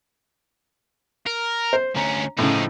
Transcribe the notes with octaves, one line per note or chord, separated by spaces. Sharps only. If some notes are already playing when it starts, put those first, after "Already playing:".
A#4
C5
D2 C#4 A#5
A2 C#3 F3 D#4